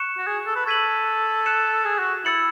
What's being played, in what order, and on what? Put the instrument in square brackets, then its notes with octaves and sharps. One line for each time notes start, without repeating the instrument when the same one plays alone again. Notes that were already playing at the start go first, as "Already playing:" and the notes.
Already playing: [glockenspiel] C#6 F#6 C#7 E7
[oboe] F#4
G#4
A4
B4
[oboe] A4 [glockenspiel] C#6 G#6 B6 D#7 F#7
[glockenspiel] F#6 C#7 E7
[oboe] G#4
F#4
[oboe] E4 [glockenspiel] E6 A6 C#7 F#7